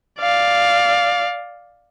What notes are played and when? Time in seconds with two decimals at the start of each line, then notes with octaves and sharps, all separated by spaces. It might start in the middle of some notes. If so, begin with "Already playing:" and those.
0.19 D5 F5